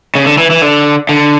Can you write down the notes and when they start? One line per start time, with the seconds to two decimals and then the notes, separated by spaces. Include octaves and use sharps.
0.15 C#3
0.26 D3
0.38 E3
0.50 E3
0.62 D3
1.09 D3